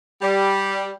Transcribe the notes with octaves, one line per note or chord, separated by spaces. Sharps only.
G3